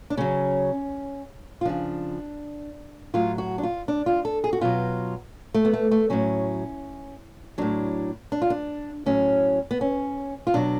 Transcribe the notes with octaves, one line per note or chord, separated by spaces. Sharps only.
D4
C#3 F#3 C#4
F4
C#3 F3 D4
A2 F#3 F4
F#4
D4
F4
D4
F4
A4
G#4
F#4
B2 F#3 F4
A3
B3
A3
A3
A2 F#3 C#4
A2 F#3 D4
D4
F4
D4
A2 F#3 C#4
B3
C#4
F4
B2 F#3 D4